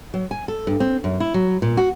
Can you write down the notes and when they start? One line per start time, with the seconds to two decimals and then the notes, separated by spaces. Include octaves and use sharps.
0.14 F#3
0.31 G#5
0.48 A4
0.67 G2
0.80 C4
1.04 F#2
1.20 E4
1.34 F#3
1.62 A#2
1.77 F#4